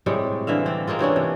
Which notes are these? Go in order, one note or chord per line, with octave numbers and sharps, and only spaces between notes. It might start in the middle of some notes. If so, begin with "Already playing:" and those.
A2 C3 G3 G#3
D3 E3 E5 F5
C4 D5
G#3 A#3 C4 F4
C3 E3 C#4 D4
C3